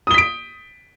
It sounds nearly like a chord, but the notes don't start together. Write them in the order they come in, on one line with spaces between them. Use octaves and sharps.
D#6 G7 B6 D7